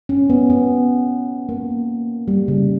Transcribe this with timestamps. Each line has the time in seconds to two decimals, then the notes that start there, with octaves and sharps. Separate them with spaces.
0.09 C#4
0.30 B3
0.50 B3
1.49 A#3
2.28 G3
2.48 C#3